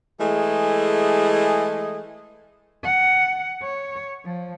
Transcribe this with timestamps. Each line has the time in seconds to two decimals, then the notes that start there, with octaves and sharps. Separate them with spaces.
0.20 E3 G#3 A3 G#4
2.84 F#5
3.63 C#5
4.24 F3